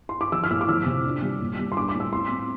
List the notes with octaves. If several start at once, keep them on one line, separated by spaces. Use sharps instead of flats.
C6
D6
F3 E6
F6
A2 E6
D6
F3 E6
C3
D4
G3
A#2
G3
C6
D4 D6
D6
A2
E6
C4 C6
C4